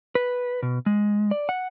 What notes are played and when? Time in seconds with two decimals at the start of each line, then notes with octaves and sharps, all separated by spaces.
0.15 B4
0.63 B2
0.86 G#3
1.31 D5
1.49 F#5